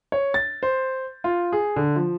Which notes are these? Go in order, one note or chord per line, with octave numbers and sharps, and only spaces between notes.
C#5
A6
C5
F4
G#4
D3
F3